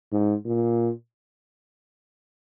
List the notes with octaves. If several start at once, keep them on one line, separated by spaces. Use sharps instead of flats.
G#2
A#2